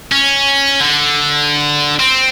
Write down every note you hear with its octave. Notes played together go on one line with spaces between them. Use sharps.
C#4
D3
C4